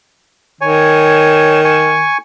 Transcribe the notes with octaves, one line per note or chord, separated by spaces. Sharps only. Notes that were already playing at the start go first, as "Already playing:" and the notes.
D#3 C#5 G#5
G#5 C#6